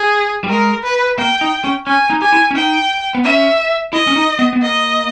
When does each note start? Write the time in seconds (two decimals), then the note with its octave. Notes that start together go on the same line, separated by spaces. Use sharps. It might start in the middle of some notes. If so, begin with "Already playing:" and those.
Already playing: G#4
0.44 G3
0.49 G#3 A#4
0.84 B4
1.18 A#3 G5
1.41 D#4
1.64 C#4
1.87 C#4 G#5
2.10 D#4
2.21 G4 G#5
2.32 E4
2.51 C#4
2.55 D#4 G5
3.15 B3
3.24 C#4 E5
3.93 E4 D#5
4.07 C#4
4.16 D#4
4.39 B3
4.53 B3
4.61 A#3 D#5